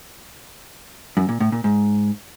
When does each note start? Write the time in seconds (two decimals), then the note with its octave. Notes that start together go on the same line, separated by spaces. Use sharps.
1.17 F#2
1.29 A#2
1.40 A2
1.52 A#2
1.64 G#2